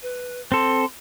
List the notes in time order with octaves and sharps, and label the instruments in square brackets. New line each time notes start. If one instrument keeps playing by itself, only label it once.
[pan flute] B4
[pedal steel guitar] C4 A4 [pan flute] C6